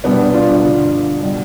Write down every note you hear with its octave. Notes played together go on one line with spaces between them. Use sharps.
C2 B2 G3 B3 D4
D4 F4
G2 D3 F3
B2 G3